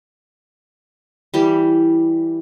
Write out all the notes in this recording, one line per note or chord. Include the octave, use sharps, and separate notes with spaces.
E3 G3 G4